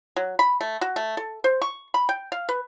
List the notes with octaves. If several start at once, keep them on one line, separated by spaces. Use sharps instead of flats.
F#3
B5
A3
F#4
A3
A4
C5
C#6
B5
G5
F5
B4